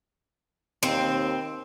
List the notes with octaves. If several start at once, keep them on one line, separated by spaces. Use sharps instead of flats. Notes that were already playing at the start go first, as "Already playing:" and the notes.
D#2 C4